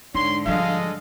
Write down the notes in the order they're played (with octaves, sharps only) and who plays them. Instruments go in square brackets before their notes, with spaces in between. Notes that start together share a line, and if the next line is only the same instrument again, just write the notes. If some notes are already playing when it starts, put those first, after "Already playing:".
[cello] G#2 D3 [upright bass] D#4 [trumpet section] C#5 C6
[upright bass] F3 G3 [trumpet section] G#3 A4 D#5 [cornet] F5